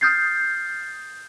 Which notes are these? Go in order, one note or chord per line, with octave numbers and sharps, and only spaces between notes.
D#6 F6 G6 A6 C7